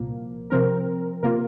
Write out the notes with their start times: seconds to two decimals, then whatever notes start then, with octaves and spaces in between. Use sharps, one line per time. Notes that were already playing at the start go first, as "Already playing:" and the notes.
Already playing: C2 A#2 F3 A#3
0.50 C3 F3 C4 A#4
1.23 C3 A#3 F4 A#4